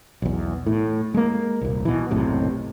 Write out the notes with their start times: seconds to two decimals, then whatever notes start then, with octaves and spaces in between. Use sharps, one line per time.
0.22 B1 E2
0.66 A2
1.14 G#3 A#3
1.61 D#1 C2
1.85 B2 E3
2.11 F#1 B1 A2 C3